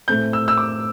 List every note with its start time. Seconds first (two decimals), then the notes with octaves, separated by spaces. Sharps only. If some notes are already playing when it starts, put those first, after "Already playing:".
0.08 A2 A3 C4 G6
0.33 E6
0.48 E6
0.57 D6